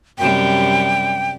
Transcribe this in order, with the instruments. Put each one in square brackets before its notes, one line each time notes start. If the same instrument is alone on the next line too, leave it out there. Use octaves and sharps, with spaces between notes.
[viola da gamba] F#2 C3 G3 [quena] G5